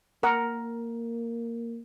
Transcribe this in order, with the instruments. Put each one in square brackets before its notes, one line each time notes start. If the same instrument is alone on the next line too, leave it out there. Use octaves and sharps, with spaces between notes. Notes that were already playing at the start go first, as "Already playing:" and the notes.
[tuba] A#3 [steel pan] A#4 F#5